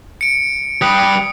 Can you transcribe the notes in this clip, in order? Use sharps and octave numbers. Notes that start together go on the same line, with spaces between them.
C#7 D7
G3 B4 D#6